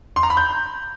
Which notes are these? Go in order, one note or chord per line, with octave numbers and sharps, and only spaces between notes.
C6
A#5
B5
G6